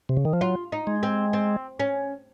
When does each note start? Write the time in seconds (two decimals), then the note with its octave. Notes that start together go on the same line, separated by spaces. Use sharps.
0.09 C3
0.17 C#3
0.25 D#3
0.33 F3
0.41 F#3 F4
0.72 D#4
0.87 G#3
1.03 C4
1.33 C4
1.80 C#4